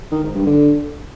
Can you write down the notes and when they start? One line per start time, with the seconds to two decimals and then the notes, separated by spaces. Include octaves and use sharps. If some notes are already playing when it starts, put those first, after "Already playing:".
0.12 D#3
0.23 G#2
0.35 G2
0.47 D3